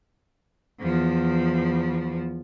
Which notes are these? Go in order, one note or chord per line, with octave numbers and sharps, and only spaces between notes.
E2 F3